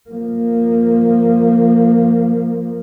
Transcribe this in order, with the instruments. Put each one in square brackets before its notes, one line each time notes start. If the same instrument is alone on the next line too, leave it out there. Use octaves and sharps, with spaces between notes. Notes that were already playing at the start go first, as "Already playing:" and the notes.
[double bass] F3 A#3